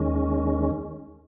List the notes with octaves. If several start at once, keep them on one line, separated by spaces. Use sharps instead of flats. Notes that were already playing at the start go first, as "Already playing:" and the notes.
Already playing: D#2 D#3 G#3 C#4